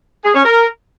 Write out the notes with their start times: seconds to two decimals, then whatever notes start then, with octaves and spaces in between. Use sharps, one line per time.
0.24 G#4
0.34 C#4
0.44 A#4